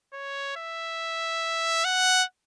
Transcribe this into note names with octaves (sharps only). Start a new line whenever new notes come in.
C#5
E5
F#5